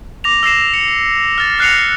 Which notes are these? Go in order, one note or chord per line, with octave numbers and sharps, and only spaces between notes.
D6 A#6 F7
E6 A#6 C7 E7
C#7
F6 A6
F6 F#6 A#6 C7 C#7 F7